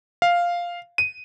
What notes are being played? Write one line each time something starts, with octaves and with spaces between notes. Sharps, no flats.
F5
D#7